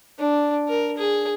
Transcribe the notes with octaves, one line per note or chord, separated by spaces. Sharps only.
D4
A#4
G#4